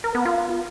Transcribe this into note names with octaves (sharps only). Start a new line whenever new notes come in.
A#4
B3
F4